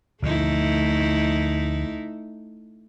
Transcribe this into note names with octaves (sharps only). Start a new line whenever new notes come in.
D2 B2 F3 A3 D#4 E4